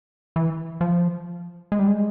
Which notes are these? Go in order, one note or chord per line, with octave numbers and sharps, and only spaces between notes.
E3
F3
G#3
G3
G#3